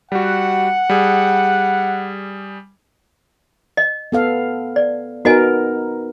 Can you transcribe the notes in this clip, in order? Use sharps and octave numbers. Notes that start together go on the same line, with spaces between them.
G3 F#4 F#5
G3 G#4
D#5
B3 A4 F5
D5
B3 D#4 F#4 A#4 D#5 G#5